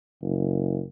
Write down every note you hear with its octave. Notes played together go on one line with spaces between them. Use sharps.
F#1